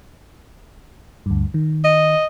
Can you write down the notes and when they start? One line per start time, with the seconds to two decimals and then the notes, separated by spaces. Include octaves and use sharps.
1.26 D2 G2
1.54 D#3
1.84 D#5